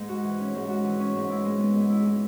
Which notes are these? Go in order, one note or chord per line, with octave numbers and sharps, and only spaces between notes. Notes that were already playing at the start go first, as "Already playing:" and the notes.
Already playing: G#2
F#4
E3
C#4
G#2
F#4
E3
C#4
G#2
E4
G#3
B3
G#2
E4
G#3